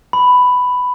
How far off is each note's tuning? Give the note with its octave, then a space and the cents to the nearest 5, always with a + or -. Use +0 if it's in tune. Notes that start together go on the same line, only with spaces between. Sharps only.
B5 +10